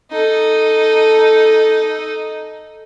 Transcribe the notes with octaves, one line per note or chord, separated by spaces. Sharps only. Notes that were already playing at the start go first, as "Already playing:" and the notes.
D#4 A4